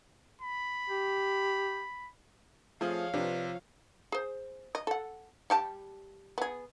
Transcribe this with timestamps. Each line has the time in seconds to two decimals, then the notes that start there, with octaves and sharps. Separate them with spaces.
0.42 B5
0.90 G4
2.81 F3 A3 C4 F4 G#4 C#5 F5
3.14 C3 F3 D4 G4 B4
4.12 G#4 C5
4.75 D#5
4.87 A4 F#5
5.50 G3 G4 A5
6.38 B3 G#4